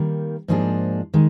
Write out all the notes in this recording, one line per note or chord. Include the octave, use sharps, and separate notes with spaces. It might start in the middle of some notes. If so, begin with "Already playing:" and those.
Already playing: D#3 G3 A#3
G#2 F3 A#3 D4 G#4
D#3 G#3